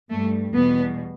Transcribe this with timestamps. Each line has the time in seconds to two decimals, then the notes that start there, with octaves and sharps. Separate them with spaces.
0.10 G2 G3 A3
0.53 E2 B2 G3 B3